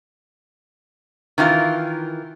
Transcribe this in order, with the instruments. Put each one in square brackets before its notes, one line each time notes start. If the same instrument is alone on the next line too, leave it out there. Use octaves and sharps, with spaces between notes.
[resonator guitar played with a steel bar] D#3 E3 F4 A#4